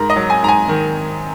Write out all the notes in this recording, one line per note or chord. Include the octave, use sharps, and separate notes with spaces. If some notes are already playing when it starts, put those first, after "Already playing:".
Already playing: G#2 A#4
D#5
F#3
G#5
G#2 A#5
G#5
D#3